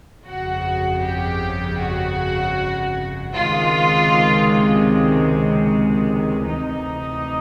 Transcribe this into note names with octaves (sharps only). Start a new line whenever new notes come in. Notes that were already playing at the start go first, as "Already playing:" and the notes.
G1 F2 C#3 F#4
G4
F#4
C#2 C3 D#3 G#3 F4
D2 C3 E3 D#4